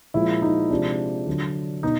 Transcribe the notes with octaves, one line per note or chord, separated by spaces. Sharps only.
A#2 F3 G#3 E4
D#4
C3 F3 G#3 D4
D3 F#3
B2 D#4